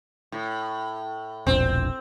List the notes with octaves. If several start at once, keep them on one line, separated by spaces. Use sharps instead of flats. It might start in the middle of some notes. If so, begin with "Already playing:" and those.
A2
E1 A#1 C4